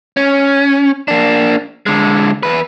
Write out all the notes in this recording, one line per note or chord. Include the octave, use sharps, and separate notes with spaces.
C#4
A#3 D4
D3 G#3
E2 B4